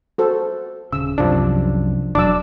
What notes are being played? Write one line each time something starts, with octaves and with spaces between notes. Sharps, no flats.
F#4 A4 C5
D#1 C#3 E6
C2 F#2 C3 F3 D4
E1 F#3 D4 D5 D6 E6